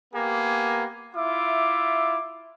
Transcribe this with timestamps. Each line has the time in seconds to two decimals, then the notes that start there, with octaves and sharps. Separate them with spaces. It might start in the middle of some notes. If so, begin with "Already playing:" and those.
0.14 A#3 B3 G4 G#5
1.14 E4 F4 E5 D6